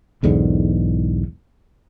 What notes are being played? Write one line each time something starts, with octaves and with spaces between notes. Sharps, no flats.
B1 E2 G#2 D3